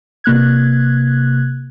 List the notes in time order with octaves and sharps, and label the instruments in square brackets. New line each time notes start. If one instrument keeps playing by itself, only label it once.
[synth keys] C3 A#3 F#6 G#6